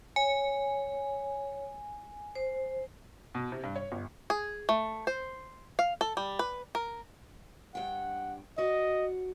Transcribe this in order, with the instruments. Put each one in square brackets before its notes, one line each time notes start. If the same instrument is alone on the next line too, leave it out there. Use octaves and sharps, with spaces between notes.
[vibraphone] C#5 [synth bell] G#5
[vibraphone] C5
[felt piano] B2
C3
G2
C#5
G1
[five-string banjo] G#4
A3
C5
F5
A4
G3
B4
A#4
[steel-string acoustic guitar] G2 G5 [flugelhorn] F#5
[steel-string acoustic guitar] F#4 D5 [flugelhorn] D#5